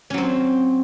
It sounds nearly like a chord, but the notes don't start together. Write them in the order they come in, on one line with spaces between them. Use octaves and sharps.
C#4 F#3 C4